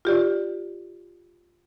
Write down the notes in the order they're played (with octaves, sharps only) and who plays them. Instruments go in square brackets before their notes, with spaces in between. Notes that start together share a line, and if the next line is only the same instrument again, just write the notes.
[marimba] F4 G4 D5